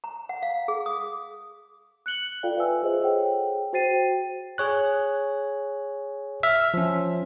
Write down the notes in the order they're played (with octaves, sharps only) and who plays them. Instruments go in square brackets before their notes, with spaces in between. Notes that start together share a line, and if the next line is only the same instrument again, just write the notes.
[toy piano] A#5
F#5
F5
G#4
D#6
[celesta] F#6 C#7 F#7 G7
F4 A4 D5 F5 G5
F4 B4 E5 G#5 E6
F4 G#4 C5 D#5 E5
G#4 A4 C5 C#5 F#5 G5
F#4 C5 G5 A6 C7 D#7
[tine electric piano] G#4 C#5 F#6
E5 F6
F3 C#4